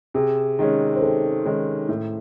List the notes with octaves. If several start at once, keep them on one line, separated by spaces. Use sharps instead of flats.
C3 G#4
D#3 G#3 C#4
C5
C3 A4
D#3 G#3 C#4
A2